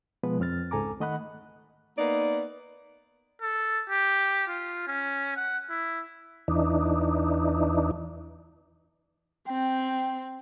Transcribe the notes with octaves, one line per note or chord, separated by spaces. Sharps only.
B2 F3 G#3 B3 B4
F2 C4 F6 A6
C#2 G#2 A4 G#5 A#5 D6
D#3 A3 D#5 F#5 B5 F#6
A#3 B3 D#4 D5
A4
G4
F4
C#4
F#5
E4
E2 E3 D4 D#4
C4 G5